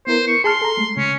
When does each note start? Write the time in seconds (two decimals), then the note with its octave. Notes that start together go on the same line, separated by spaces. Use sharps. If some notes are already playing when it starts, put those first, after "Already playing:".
0.07 B3 E4 A#4 C5
0.27 C#6
0.44 G#4 A5 C6 F6
0.62 A4 A#5
0.77 G#3 A3
0.97 C#3 C#4